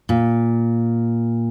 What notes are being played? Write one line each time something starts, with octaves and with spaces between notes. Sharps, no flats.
A#2